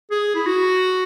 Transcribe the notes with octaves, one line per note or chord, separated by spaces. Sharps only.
G#4
E4
F#4